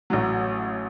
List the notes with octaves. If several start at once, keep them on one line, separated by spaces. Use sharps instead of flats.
A1 A2 F#3